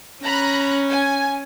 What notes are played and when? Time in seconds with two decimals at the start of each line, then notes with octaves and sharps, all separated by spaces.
0.24 C#4 A#5 B5 F#6
0.89 G#5